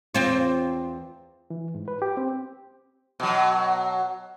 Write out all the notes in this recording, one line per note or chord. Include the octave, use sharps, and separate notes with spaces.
E2 C4 F4
E3
G#2
B4
G4
C4
B2 F#3